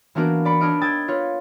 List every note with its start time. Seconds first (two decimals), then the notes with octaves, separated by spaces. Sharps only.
0.15 E3 A#3 B3 D4 F#4 A#4
0.45 D5 B5 C#7
0.61 D4 C#5 D#5 F6 D7
0.81 G5 D#6 E6 G#6 A6
1.08 F4 B4 C#5